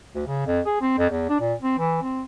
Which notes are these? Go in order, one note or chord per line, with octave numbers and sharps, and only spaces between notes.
D2
C#3
F2
G#4
C4
F2
E2
D4
A#2
C4
E3
C4